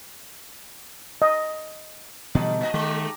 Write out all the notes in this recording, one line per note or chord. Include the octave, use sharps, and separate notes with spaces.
D#5
B2 D3 E3 G3 D#4 A5
A#2 D#5 A5 A#5
D#3 G#3 A3 G4